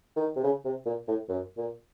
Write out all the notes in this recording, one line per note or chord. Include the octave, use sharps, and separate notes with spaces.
D#3
C3
C#3
C3
A#2
A2
F#2
A#2